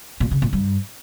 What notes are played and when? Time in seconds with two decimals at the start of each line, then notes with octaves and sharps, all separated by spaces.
0.20 A#2
0.31 C#3
0.42 A#2
0.53 G2